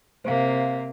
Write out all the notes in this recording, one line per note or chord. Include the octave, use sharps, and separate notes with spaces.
C3 A#3 C5 F5